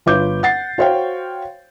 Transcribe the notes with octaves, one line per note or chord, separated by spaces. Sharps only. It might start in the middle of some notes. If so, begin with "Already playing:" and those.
G1 F4 B4 C#5 D6 G6
F#5 A6 C7
F#4 C5 C#5 F5 G5